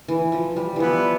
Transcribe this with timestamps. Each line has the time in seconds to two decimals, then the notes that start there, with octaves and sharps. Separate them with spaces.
0.08 E3
0.32 F3
0.56 G3
0.76 E3 F3 B3 E4 B4 D5